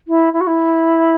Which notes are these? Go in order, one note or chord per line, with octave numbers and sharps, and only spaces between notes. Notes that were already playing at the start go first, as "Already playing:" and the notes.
E4
E4
F#4
E4